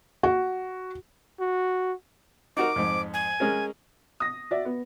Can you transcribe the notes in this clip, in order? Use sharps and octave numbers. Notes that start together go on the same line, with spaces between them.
F#4
F#4
D#4 F#4 A#4 D6
F2 G#2
G#5
G#3 C#4 A#4
D#6 A#6
F#4 D5 E5
B3